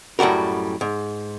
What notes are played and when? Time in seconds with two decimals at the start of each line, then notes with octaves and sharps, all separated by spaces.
0.19 F#2 A2 G3 F#4 A#4
0.81 G#2